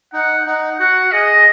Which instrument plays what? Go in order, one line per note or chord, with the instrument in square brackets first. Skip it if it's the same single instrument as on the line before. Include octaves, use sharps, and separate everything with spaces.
[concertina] D#4 [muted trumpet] F#5
[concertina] D#4 [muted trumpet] F#5
[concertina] F#4 [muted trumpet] F#5
[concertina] G#4 [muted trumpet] D#5
[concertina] G#4